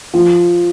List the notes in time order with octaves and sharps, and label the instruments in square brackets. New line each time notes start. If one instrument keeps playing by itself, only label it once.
[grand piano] F3